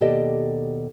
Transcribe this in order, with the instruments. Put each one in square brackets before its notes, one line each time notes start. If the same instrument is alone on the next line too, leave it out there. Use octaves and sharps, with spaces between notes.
[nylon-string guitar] D#2 B2 G4 A4 D5 D#5